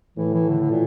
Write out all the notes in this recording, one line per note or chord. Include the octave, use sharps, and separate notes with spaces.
A2 E3
E3
D3
D3
A#2